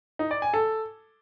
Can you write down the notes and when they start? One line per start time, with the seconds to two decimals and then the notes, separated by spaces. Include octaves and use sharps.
0.19 D#4
0.31 D5
0.42 G#5
0.54 A4